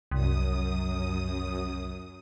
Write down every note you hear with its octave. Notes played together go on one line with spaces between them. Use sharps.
C2 F#2 D#6